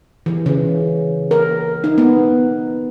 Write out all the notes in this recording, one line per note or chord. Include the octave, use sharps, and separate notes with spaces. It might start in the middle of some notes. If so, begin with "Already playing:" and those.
E3
C#3
A#4
D#4
B3